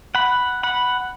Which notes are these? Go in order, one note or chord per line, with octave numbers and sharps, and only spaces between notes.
F#5 B5
F#5 B5